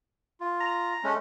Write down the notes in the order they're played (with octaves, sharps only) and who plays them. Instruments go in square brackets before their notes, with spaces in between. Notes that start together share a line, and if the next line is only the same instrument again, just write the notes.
[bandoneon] F4
[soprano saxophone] A#5
[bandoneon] G#3 A3 C#4